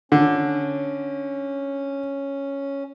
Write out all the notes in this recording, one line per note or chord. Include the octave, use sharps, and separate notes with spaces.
D3 C#4